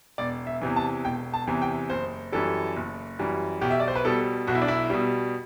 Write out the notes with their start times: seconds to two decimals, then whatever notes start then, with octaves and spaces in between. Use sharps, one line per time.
0.18 E1 D5
0.47 E5
0.61 E2 C3 E3
0.76 A5
1.05 E1 G5
1.34 A5
1.47 E2 C3 E3
1.62 G5
1.90 F#1 C5
2.32 F#2 E3 G3 A4
2.76 F#1
3.19 F#2 E3 G3
3.61 B1 G4
3.71 E5
3.80 D5
3.88 C5
3.96 B4
4.05 B2 G3 A4
4.47 B1 F#4
4.55 E4
4.62 D4
4.68 E4
4.90 B2 G3